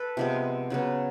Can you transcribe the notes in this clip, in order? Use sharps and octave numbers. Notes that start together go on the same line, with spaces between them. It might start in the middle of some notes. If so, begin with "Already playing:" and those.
Already playing: A4 B4
C3 F3 G#3 B3
C#3 F#3 B3